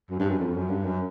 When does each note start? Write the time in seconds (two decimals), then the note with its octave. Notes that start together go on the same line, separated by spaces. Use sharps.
0.10 F#2
0.20 G2
0.29 F#2
0.39 F2
0.54 F#2
0.69 G2
0.84 F#2